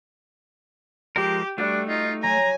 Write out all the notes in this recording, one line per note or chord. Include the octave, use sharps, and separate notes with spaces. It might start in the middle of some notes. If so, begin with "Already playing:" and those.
F3 G#3 G4 A#4
G3 A3 D4 F#4
D#4 F4
F#3 G#5 A#5